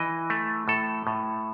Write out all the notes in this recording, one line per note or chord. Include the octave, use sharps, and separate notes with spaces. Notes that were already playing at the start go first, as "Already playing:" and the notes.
Already playing: E3 D#5
A3
A2 A4
A2